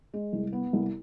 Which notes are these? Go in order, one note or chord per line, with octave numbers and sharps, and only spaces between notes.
G#3
C2
B3
C2